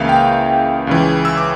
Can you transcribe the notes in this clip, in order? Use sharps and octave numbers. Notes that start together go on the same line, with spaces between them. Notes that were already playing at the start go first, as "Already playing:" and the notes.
Already playing: C#2 C#3 E3 A#3 E5 F5
G5
C#2 C#3 E3
E6
D6